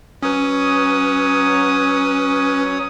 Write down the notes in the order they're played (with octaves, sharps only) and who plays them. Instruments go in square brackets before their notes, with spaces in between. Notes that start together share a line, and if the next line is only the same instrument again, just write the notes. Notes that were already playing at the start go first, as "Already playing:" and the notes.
[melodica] F#3 C#5 D#6 [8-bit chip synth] C#4 B4